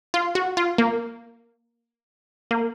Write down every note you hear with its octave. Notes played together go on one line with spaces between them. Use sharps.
F4
F#4
F4
A#3
A#3